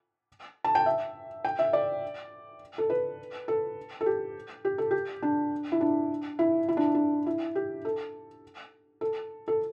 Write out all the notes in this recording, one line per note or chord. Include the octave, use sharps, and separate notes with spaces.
A5
G5
E5
G5
E5
D5
A4
B4
A4
A4
G4
G4
A4
G4
D4
E4
D4
E4
E4
D4
D4
E4
G4
A4
A4
A4